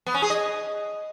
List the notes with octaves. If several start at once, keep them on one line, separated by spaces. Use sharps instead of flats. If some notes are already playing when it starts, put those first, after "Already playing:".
B3
C#4
G#4
D#5